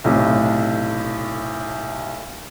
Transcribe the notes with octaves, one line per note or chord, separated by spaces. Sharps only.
B1 A2 C3